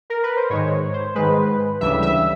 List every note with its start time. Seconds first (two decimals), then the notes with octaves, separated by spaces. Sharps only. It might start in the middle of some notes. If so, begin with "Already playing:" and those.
0.10 A#4
0.23 B4
0.37 C5
0.50 G#2 D#3 G#3 C#5
0.93 C5
1.15 G#2 D#3 G#3 B4
1.81 D2 C#3 E3 G3 E5
2.02 E5